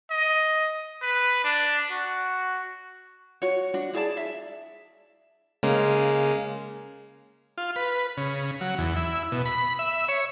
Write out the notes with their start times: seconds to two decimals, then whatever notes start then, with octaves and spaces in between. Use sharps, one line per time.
0.11 D#5
1.02 B4
1.44 D4
1.91 F#4
3.42 F#4 C#5
3.74 D4 F#4
3.93 E4 G#4 D5 A5
4.17 E5
5.63 C#3 G#3 A#3
7.58 F4
7.76 B4
8.17 C#3
8.61 F#3
8.78 E2
8.96 E4
9.32 B2
9.46 B5
9.79 E5
10.09 C#5